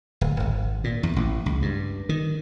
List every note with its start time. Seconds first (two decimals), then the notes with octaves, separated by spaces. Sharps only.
0.21 D1
0.40 G#1
0.84 A#2
1.03 E2
1.16 A1
1.46 C#2
1.62 G2
2.09 D#3